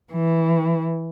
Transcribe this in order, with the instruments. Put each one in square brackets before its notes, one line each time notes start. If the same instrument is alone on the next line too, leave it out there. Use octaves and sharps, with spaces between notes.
[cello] E3